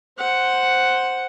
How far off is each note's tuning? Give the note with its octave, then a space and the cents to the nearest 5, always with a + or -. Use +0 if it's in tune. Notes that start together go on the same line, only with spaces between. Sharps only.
C5 +0 F#5 +0